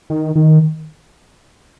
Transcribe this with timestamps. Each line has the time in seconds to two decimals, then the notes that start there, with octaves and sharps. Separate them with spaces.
0.10 D#3
0.36 D#3